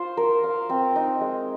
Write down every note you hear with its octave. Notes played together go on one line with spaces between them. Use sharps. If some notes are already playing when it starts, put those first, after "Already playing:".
Already playing: F4 C5
A#4
F5
C4
D#4
G#3